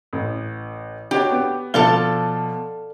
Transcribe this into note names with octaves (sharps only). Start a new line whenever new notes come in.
A1
D4 F#4 G4 C#5
B3
B2 F3 A4 D5 F5 G7